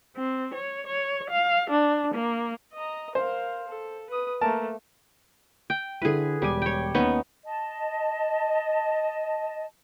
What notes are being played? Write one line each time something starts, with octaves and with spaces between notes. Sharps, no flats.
C4
C#5
C#5
F5
D4
A#3
D#5 A#5
A#4 C5 F5
A4
B4 D#6
A3 A#3 A#4 A5
G5
D3 E4 G#4 B4
E1 G3 G#5 D6
C#5 G5
D#2 B3 C#4 D#4
D#5 A5